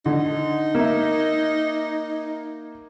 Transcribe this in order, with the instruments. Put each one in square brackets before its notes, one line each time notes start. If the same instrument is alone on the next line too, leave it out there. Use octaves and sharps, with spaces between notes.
[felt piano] D3 [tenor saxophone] D#4
[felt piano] A#3 E5